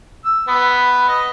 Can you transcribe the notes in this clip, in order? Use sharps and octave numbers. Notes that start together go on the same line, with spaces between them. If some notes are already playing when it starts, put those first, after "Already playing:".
E6
B3
D#5